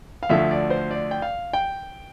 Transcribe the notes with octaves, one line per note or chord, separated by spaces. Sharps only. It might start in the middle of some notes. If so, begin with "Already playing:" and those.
F5
D2 D3 F3 A3 E5
D5
C5
D5
G5
F5
G5